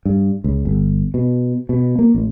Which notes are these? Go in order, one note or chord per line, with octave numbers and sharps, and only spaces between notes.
G2
C#2
G1
B2
B2
A#3
A1